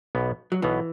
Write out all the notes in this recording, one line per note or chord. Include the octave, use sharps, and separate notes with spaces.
B1 B2 B3
F#3
B1 B2 E3 B3